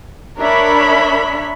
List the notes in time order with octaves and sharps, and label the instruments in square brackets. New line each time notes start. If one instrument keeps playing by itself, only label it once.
[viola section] D4 A#4 C#5 E5 B5